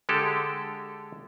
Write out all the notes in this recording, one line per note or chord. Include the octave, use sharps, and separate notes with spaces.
D3 G#3 G4 A4